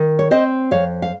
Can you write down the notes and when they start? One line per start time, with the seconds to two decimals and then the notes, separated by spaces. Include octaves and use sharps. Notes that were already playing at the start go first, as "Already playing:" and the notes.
Already playing: D#3
0.19 C#5
0.31 C4 C5 D#5
0.71 F2 C#5 F5
1.02 F5